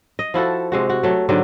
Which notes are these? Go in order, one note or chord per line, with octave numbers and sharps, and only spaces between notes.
D#5
F3 E4 F#4 A4
C3 G#3 F#4
F#4
F#3 A3
G#2 D3 F#3 G3